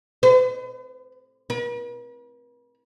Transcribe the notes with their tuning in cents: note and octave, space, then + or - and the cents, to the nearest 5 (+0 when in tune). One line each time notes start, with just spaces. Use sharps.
B4 +40
B4 -45